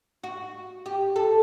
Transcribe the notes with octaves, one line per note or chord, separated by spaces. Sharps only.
F#4
G4
A4